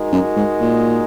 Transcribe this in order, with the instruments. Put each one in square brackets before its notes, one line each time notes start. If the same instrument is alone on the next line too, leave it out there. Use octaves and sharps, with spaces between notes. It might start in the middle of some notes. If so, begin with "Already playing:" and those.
Already playing: [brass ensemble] G#3 D#4 F#4 A#4
[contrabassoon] F#2
G#2
A#2